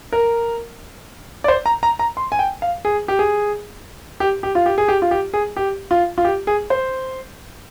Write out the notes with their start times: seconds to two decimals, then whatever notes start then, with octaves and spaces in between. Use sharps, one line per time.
0.13 A#4
1.44 D5
1.48 C5
1.66 A#5
1.83 A#5
1.99 A#5
2.17 C6
2.32 G#5
2.39 G5
2.62 F5
2.85 G#4
3.08 G4
3.19 G#4
4.20 G4
4.43 G4
4.55 F4
4.66 G4
4.78 G#4
4.88 G4
5.02 F4
5.11 G4
5.34 G#4
5.57 G4
5.91 F4
6.18 F4
6.25 G4
6.47 G#4
6.70 C5